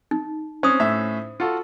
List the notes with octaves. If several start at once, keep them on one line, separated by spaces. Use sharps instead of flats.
D#4
C4 C#4 C5 D#6
A2 C#4 E5
F4 F#4 A4